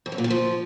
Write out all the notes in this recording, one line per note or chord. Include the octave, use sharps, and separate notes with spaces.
F2
F#2
A#2
D#3
F3